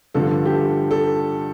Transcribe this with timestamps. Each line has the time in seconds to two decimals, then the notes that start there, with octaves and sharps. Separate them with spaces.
0.14 G2 D3 F3 A4
0.46 G4
0.53 A4
0.91 A4